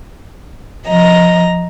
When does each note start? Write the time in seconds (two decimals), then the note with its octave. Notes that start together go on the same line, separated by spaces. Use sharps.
0.86 F3 D#5 A#5